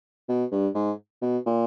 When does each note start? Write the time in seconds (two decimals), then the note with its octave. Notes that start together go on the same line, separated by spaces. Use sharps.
0.29 B2
0.52 G2
0.75 G#2
1.22 B2
1.46 A#2